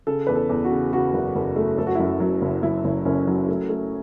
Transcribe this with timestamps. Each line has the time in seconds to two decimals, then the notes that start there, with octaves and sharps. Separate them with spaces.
0.07 C#3 A4
0.27 E2 B4
0.35 A4
0.49 E2
0.64 F#4
0.71 C#3
0.93 C#3 F#4
1.14 F#1
1.36 F#1
1.56 A3
1.78 F#1 A4
1.87 F#4
1.95 E4
1.99 F#2 F#4
2.20 F#3
2.42 F#1
2.63 F#1 E4
2.84 F#1
3.05 F#1 C#4
3.27 F#3
3.48 A3
3.69 A3